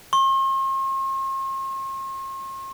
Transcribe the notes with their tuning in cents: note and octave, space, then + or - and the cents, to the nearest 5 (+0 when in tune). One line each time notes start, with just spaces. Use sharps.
C6 +45